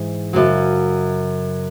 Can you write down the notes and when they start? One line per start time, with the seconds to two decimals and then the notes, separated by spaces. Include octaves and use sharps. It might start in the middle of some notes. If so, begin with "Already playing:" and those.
Already playing: G#2 E3 E4
0.33 F#2 C#3 F#3